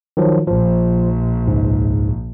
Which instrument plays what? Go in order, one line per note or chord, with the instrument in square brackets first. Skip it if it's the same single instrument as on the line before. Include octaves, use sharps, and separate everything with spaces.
[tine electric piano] D#3 F3 F#3
[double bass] A#1 [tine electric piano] F3
[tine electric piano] C#2 G#2